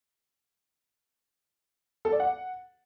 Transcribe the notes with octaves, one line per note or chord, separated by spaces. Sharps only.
A4
D5
F#5